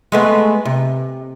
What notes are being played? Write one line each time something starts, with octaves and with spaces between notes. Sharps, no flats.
G#3 A3 B3
C3